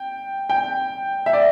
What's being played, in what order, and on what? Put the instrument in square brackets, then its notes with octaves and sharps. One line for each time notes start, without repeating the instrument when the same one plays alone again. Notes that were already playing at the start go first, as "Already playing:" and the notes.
Already playing: [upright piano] G5
G5
E5
D5